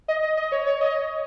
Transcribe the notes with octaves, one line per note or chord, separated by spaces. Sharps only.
D#5
D#5
D#5
C#5
C#5
D#5